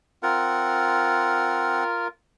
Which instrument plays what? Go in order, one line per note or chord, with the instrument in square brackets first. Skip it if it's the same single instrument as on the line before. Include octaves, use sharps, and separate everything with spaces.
[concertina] C4 F#5 [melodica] F4 A#4